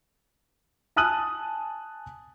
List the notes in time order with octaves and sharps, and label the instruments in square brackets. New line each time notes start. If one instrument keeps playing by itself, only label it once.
[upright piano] G#5 A5 D#6 F#6 D#7 F#7